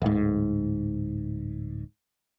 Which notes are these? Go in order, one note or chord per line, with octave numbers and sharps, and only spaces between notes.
D1 G#2